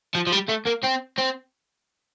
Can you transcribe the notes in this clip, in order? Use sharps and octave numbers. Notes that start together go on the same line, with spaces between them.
F3
F3
G3
A3
A#3
C4
C4